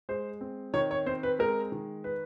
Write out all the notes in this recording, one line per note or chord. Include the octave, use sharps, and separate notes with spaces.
G#3 C5
C4
D#3 C#5
C#5
C4 C5
B4
G#3 A#4
D#3
B4